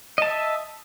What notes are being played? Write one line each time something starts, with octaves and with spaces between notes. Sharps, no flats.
D#5 E5 A5